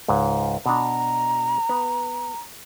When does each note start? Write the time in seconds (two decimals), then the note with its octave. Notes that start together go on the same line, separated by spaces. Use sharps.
0.08 C#2 G#2
0.66 B2 D4 A#5
1.69 B3